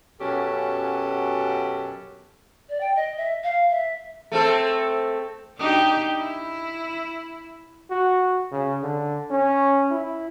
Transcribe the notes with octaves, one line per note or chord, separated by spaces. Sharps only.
F#2 B2 C#4 G4 A4
D5
G5
D#5
E5
F5
E5
A3 C4 A4
D4 D#4 G4
E4
F#4
C#3
D3
C#4
E4